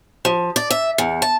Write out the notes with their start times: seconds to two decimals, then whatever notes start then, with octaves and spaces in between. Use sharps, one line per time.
0.25 F3
0.56 D5
0.70 E5
0.98 E2
1.22 A5